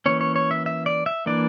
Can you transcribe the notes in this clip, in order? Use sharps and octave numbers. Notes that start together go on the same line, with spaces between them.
E3 A#3 C#4 C#5
C#5
C#5
E5
E5
D5
E5
E3 A#3 D4 D5